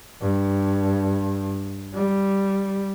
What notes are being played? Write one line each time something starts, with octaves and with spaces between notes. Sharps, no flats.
G2
G3